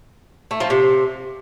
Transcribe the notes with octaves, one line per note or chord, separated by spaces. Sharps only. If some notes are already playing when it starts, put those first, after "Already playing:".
A3
F3
C3